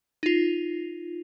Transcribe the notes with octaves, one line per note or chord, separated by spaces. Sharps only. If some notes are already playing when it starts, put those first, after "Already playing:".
D#4 F4